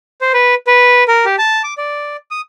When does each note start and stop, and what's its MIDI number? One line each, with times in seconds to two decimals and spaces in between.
0.21 0.32 72
0.34 0.55 71
0.67 1.04 71
1.08 1.25 70
1.25 1.36 67
1.38 1.62 81
1.64 1.74 86
1.78 2.17 74
2.31 2.41 87